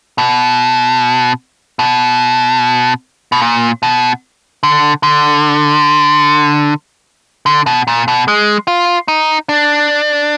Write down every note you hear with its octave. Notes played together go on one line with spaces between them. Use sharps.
B2
B2
B2
A#2
B2
D3
D3
D3
B2
A#2
B2
G#3
F4
D#4
D4